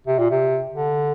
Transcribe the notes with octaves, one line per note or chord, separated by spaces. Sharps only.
C3
A#2
C3
D3